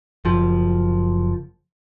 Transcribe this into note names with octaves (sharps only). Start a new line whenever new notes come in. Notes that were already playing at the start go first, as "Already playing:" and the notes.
F#1 F3